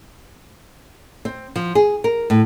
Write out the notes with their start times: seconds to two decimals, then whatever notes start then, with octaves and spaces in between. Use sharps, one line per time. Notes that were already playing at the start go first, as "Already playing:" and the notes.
1.25 C4
1.56 F3
1.75 G#4
2.04 A#4
2.30 A2